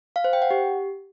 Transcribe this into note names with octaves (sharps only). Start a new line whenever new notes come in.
F5
C5
G5
F#5
G4